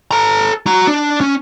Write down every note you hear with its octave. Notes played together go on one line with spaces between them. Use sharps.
A4 A#5
F#4 A#5
D4
C#4